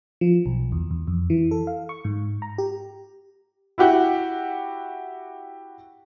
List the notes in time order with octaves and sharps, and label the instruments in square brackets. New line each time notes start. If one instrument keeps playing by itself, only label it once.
[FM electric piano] F3
B1
E2
E2
F2
E3
A4
F5
C#6
G#2
A#5
G4
[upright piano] E4 F#4 G4 F#5